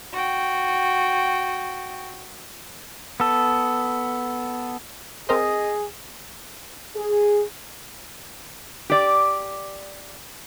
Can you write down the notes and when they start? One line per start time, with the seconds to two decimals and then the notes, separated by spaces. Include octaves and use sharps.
0.12 F#4 G5
3.20 B3 A4
5.29 C4 G#4 A#4 C5 D#5
6.95 G#4
8.90 G4 D5